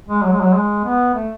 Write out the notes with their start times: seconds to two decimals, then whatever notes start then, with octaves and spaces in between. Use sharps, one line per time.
0.09 G#3
0.24 F#3
0.33 G#3
0.41 F#3
0.54 G#3
0.85 B3
1.15 A3